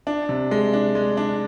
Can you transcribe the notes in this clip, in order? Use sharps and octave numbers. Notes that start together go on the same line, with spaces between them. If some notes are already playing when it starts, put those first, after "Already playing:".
D4
C3
G#3
D4
G#3
D4